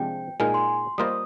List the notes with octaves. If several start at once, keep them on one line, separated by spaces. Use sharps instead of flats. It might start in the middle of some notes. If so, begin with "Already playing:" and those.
Already playing: C3 F3 G#3 D4 G5
A#2 G#3 D#4 A#4 G#5
C6
G3 A#3 F4 C5 D#5 D#6